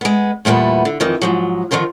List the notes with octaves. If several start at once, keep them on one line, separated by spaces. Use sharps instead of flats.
G#3 B3
E2 A#2 G3 A3 B3
D3
F2 D#3 E3
G#2 F3 F#3
D3 D#3 F3 F4 A#4